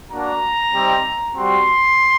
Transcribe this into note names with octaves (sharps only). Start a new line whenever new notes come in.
A#3 D4 F#4 A#5
G3 C4 D#4
G3 C4 F#4 C6